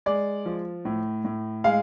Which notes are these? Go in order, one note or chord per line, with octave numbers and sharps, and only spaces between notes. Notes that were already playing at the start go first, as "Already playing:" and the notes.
G#3 D5
F3
A2
A2
G#3 F5